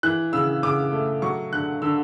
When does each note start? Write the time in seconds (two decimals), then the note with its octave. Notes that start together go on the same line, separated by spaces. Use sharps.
0.03 E3 F#6
0.33 C#3 E6
0.63 C#3 D6
0.92 A3
1.22 F#3 C#6
1.52 D3 F#6
1.82 D3 E6